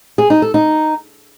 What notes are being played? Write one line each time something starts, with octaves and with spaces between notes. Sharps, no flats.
G#4
D#4
A4
D#4